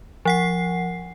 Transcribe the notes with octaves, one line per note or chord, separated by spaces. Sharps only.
F3 F#5 C7